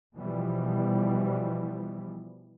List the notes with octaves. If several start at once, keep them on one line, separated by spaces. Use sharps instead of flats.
B2 E3 F3 G3